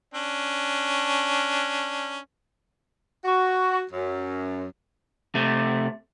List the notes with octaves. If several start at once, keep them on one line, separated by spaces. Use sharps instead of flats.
C#4 D4
F#4
F#2
C3 A3